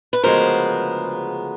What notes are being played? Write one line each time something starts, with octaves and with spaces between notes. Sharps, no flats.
B4
D2 C#3 F3 G#3 B3 A#4 C5